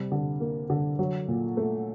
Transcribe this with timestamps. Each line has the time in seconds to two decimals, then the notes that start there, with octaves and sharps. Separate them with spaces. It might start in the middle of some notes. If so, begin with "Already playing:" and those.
Already playing: C3 G3
0.12 D3
0.40 A#3
0.70 D3
0.99 F#3
1.28 A#2
1.57 A3